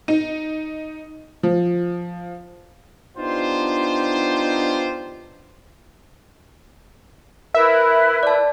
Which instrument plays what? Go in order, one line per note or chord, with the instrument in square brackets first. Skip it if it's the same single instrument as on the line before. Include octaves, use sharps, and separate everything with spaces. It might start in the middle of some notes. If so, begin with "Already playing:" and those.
[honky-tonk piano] D#4
F3
[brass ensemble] B3 D4 D#4 F4 G4 C5
[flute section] E4 B4 [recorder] A#4 [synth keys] E5
[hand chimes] D5 A5